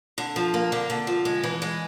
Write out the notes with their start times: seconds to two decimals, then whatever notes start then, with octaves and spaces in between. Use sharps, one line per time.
0.18 D3
0.36 F3
0.54 A#3
0.72 D3
0.90 D3
1.07 F3
1.25 G#3
1.44 E3
1.62 G#3